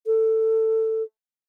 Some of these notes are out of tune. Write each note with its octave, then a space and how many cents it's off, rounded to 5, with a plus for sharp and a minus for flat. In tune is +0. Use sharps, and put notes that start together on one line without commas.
A4 +15